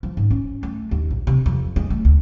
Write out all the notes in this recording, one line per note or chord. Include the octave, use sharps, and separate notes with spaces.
F3
G#2
C#4
A3
D#2
A#1
C3
F2
G#3
A3
D2